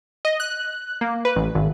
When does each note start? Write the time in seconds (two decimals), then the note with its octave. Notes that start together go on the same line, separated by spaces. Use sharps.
0.25 D#5
0.40 F#6
1.01 A#3
1.25 B4
1.36 A1
1.55 G#1